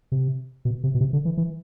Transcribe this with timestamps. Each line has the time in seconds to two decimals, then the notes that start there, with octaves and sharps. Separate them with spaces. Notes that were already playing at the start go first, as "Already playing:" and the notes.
0.12 C3
0.65 B2
0.84 C3
0.95 B2
1.01 C3
1.13 D3
1.25 E3
1.37 E3